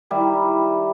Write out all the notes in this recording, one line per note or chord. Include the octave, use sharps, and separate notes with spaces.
D#3 G3 E4